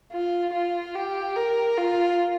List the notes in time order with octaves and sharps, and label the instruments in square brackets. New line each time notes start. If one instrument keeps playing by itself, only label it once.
[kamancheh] F4
F4
G4
A#4
F4